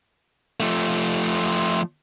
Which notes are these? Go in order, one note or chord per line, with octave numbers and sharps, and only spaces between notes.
F3 A3